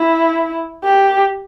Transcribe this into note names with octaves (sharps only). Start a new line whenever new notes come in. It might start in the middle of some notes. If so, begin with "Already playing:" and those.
Already playing: E4
G4